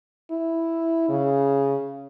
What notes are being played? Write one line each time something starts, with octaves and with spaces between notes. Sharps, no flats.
E4
C#3